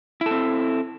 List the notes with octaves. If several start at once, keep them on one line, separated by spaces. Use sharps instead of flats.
C4 E4 A4